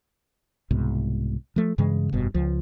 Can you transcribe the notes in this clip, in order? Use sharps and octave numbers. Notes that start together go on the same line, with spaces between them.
C2 G#2 B2
F3 A3
G2 C#3 E3 G#3
F1 G2 B2
C#2 F3